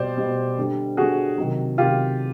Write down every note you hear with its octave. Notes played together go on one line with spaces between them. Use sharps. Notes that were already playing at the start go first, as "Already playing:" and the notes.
Already playing: B2 G3 C5 D5
B2 G3
D3 G3
D3 G3 F#4 G#4
C3 D#3 F#3
C3 D#3 F#3 F4 G4